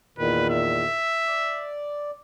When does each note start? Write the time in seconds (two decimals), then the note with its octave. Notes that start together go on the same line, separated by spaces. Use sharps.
0.18 E2 A#2 D#3 B4
0.50 E5
1.26 D5